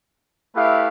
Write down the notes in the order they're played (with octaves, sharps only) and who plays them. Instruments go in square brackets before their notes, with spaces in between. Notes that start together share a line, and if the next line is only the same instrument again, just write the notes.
[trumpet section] A3 E4 G4 B4 F5